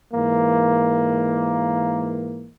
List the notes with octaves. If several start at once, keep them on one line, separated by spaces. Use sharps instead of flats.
G#2 E3 A#3